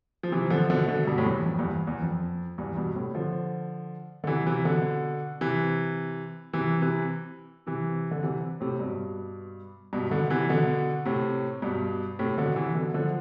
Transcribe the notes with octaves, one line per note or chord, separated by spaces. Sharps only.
F3
C3 E3
D3 F3
B2 D3
B2 D3
G2 B2
A2
E2 G2
F2
E2 G2
E2
F2
E2 G2
G2 B2
A2 C3
D3 F3
D3
C3 E3
C3 E3
B2 D3
C3 E3
C3 E3
C3 E3
C3 E3
D3
C3 E3
A2 C3
G2 B2
G2 B2
B2 D3
C3 E3
B2 D3
A2 C3
G2 B2
A2 C3
B2 D3
C3 E3
B2 D3
D3 F3